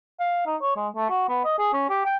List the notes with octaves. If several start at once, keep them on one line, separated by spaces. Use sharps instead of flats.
F5
D#4
C#5
G#3
A3
F#4
B3
D#5
G#4
C#4
G4
G5